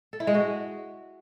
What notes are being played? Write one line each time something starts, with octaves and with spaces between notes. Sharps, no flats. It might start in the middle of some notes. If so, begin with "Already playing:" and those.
A4
E4
G#3
F#4